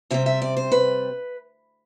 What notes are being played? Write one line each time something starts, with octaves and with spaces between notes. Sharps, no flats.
C3 G3 C4 E5
E5
D5
C5
B4